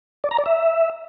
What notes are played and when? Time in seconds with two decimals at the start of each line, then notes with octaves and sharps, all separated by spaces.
0.24 D5
0.31 A#5
0.39 D5
0.46 E5